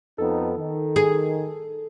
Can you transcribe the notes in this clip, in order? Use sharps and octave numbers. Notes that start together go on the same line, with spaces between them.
F2 B3 D#4 A4
D#3
G#4